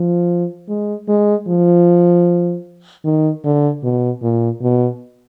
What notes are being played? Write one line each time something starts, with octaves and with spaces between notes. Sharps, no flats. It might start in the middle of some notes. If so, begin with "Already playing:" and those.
Already playing: F3
G#3
G#3
F3
D#3
D3
B2
A#2
B2